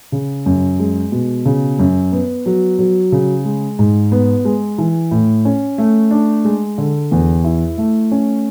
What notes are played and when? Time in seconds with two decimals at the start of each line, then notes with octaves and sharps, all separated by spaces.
0.12 C#3
0.46 F#2
0.79 G#3
1.12 B2
1.45 C#3
1.79 F#2
2.12 B3
2.46 F#3
2.79 F#3
3.12 C#3
3.45 G#3
3.79 G#2
4.12 B3
4.45 G#3
4.78 E3
5.11 A2
5.45 C#4
5.78 A3
6.11 D4
6.45 G#3
6.78 D3
7.11 E2
7.44 E4
7.78 A3
8.12 C#4